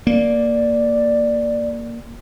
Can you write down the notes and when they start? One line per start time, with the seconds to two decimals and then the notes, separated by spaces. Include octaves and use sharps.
0.07 A#3 D5